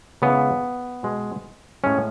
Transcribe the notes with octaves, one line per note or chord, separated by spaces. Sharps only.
C#3 E3 G#3 B3
B2 G#3
A2 G#3 C#4